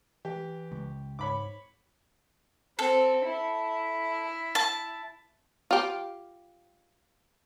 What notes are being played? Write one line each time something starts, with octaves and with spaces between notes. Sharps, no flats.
E3 G4
C#2
G#2 C#5 B5 D6
C4 A4
E4
A5
F4 G4